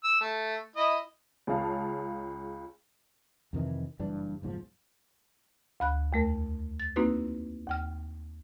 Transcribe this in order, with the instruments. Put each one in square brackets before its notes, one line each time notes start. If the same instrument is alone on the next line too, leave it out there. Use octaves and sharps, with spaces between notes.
[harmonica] E6
A3
E4 D#5
[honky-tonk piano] C#2 C#4 G#4 F5 A5
[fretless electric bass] F2 C3 D#3 E3
F#1 G2 E3 D4
F#1 B1 G#2 F3
[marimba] D2 B5 F#6
E2 A3 A#4
A6
A#3 C4 D#4 E4 F#4 B4
D#2 G5 F6